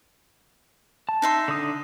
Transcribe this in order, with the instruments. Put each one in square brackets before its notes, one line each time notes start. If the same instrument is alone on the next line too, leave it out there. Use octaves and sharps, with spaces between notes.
[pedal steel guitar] A5
[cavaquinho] D#4 E5 C6
[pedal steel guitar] D3 D#6